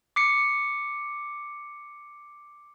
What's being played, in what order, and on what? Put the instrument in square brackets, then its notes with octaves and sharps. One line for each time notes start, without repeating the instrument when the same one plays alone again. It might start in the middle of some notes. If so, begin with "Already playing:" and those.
[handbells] D6 C7 C#7